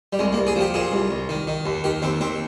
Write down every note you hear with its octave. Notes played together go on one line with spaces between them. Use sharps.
G3
C2 G#3
A#3
C2
G#4
F3 G4
A#2 G#4
C2
C2
D#3
D#3
D#2
D#3 G4
D#2 C4
D#2 C4